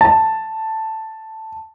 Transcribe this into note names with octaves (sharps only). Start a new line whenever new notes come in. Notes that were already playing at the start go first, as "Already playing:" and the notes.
A5